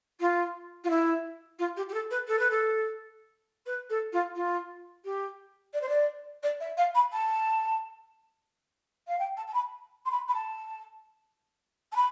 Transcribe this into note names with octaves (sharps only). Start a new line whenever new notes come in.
F4
F4
E4
F4
G4
G4
A4
B4
A4
B4
A4
B4
A4
F4
F4
G4
D5
C5
D5
D5
E5
F5
B5
A5
F5
G5
A5
A5
B5
C6
B5
B5
A5
A5
B5